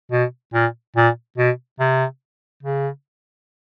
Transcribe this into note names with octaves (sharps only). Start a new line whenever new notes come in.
B2
A#2
A#2
B2
C3
C#3